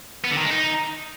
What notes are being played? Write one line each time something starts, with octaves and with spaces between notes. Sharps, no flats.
B3
D3
D#3
G#3
D#4